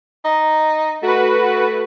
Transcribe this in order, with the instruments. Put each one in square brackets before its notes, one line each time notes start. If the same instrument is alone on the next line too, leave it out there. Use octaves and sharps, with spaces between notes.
[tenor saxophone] D#4
[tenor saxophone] A3 [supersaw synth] F#4 B4